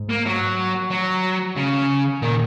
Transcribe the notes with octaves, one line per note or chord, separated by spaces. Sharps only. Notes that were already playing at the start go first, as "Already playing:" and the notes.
Already playing: G#2
A#3
F#3
F#3
C#3
A#2 D#3